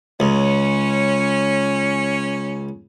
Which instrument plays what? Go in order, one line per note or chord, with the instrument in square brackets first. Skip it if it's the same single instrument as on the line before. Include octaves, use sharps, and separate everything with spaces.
[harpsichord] C#2 [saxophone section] C#4